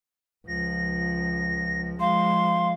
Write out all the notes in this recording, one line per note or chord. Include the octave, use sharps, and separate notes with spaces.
C#2 F3 A#6
F3 G#3 F5 C6